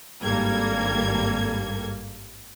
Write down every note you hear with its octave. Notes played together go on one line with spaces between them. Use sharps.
G#1 G2 G3 A#3 A4 G#6